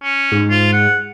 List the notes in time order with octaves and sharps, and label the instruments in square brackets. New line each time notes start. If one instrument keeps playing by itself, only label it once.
[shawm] C#4
[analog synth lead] G#2
[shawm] F4
F#5